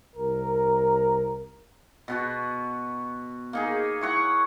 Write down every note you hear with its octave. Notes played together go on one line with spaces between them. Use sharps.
C2 A#4
B2 B3 F#4
A#3 D#4 G#4
E4 C#5 F#5 C#6